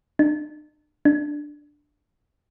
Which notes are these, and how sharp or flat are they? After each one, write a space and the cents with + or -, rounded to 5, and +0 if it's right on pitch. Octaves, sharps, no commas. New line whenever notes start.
D4 +45
D4 +5